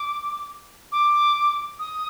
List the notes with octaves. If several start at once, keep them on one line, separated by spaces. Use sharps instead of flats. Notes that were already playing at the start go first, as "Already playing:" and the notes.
Already playing: D6
D6
D#6